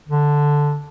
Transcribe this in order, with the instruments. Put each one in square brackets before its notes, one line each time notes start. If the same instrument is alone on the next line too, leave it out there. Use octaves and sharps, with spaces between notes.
[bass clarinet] D3